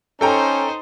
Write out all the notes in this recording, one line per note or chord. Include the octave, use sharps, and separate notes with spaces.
C#4 D#4 A4 C5 G5 A#5